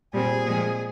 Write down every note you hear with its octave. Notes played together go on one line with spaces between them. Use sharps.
A#2 G3 C4 G#4
A#2 F3 G#3 C4